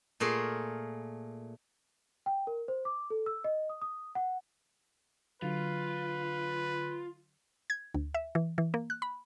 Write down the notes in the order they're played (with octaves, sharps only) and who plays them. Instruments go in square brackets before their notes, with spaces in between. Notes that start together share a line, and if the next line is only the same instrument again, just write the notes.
[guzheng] A#2 A3 G#4 A#4 C6
[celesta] G5
A#4
C5
D6
A4
E6
D#5
D#6
D#6
F#5
[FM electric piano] D3 F#3 [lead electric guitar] F4 [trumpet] B4
[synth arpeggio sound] G#6
D2
E5
E3
E3
A#3
F#6
B5